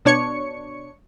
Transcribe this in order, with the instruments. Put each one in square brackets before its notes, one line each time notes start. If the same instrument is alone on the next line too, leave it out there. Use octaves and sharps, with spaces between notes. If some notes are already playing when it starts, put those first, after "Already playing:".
[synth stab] B2 D4 C#5 C#6 C#7